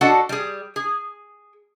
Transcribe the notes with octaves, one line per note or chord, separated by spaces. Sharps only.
D4 F#4 A4 D5 D#5 F#5
G3 G#4
G#4